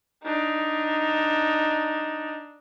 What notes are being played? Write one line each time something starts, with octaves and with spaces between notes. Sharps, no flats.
D4 D#4